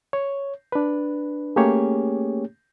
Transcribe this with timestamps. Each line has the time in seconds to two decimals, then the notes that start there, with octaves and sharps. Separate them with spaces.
0.13 C#5
0.72 D4 B4
1.56 A3 A#3 C#4 G4 G#4 C#5